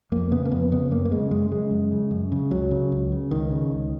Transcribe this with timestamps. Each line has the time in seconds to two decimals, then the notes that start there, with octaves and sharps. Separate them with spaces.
0.12 F2 A#3
0.31 C#3 B3
0.45 A#3
0.52 F2 B3
0.72 C#3 B3
0.91 F#2 A#3
1.05 A#3
1.12 C#3 G#3
1.31 F#2 G#3
1.51 C#3 G#3
1.71 F#2
1.92 C#3
2.11 F#2
2.32 C#3
2.51 C#2 F#3
2.71 C#3
2.92 C#2
3.12 C#3
3.31 C#2 D#3
3.51 C#3
3.71 C#2